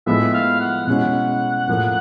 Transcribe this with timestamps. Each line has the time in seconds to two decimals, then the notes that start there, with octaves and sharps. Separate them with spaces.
0.07 A2 F3 G#3 B3 E4 E5
0.34 F5
0.60 F#5
0.87 B2 G#3 C#4 E4 F#5
1.68 A2 F3 A#3